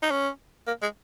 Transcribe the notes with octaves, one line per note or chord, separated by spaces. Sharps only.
D#4
C#4
A#3
G#3